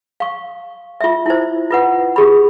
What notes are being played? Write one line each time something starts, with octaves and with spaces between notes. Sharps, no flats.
F5 C#6
F4 E5
E4 C5
F4 B4 F#5
G4 G#4 B5